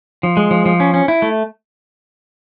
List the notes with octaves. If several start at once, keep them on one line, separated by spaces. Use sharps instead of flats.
F3
G#3
F3
F3
C#4
C#4
E4
A3